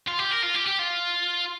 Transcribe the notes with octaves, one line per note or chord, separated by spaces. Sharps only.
F4
G4
A#4
F4
G4
G4
F4